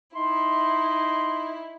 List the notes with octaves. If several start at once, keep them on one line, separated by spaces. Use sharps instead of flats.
D#4 E4 C6